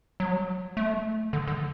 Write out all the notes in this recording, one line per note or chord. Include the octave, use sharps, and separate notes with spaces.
F#3
A3
D3
D3